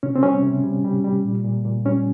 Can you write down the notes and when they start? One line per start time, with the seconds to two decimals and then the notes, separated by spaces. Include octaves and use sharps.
0.03 C3 C#4
0.16 C4
0.23 G3 C#4
0.43 C3
0.64 G3
0.85 G3
1.04 G3
1.25 A#2
1.44 A#2
1.65 A#2
1.85 G3 C#4